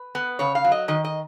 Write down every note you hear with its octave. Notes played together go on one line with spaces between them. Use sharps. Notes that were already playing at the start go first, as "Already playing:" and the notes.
Already playing: B4
B3
C#3 C#5
F5
F#3
D#5
D#3 D#5
D#5